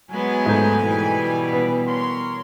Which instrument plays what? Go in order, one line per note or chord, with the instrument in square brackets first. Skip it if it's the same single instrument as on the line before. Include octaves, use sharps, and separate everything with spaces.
[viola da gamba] F#3 G#3 B3 [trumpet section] G#5
[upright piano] G#2 A3 G6
[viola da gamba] B2 E3 G3
[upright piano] B3
[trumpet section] A#4 C#5 C6